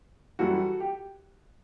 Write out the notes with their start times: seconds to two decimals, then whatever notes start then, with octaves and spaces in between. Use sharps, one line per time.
0.39 F#2 E3 G3 F#4 A4
0.80 G4